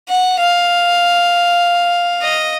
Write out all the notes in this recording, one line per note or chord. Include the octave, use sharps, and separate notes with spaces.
F#5
F5
D#5